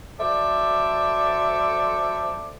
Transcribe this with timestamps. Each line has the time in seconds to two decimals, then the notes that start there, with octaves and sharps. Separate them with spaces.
0.20 F#3 A4 C5 D5 E5